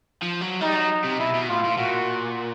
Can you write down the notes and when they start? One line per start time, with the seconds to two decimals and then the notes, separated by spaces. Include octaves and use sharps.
0.22 F3
0.41 F#3
0.61 G3 D#4
0.75 F#3
1.04 C3
1.19 B2 E4
1.33 B2
1.48 A2 F4
1.64 A2
1.77 A#2 F#4